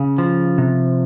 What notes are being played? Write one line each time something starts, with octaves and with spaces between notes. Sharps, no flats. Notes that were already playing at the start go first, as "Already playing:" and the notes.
Already playing: C#3
F3
C3